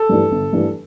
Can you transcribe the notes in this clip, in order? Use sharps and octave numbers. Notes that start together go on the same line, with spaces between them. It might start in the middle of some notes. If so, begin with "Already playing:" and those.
Already playing: A4
G2 E3 A3 D4
G1
G2 E3 A3 D4